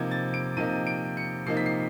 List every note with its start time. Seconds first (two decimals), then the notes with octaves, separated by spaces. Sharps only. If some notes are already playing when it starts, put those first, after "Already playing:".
Already playing: C3 F3 A#3 D#4 G#6
0.11 A6
0.34 D7
0.57 C3 F3 A#3 D#4 D#7
0.87 D7
1.17 C#7
1.46 C3 F3 A#3 D#4 C7
1.57 B6
1.66 C7